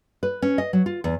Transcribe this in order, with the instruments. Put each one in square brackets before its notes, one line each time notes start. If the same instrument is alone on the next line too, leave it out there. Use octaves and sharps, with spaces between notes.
[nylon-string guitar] B4
C#4
D#5
F#3
F4
E2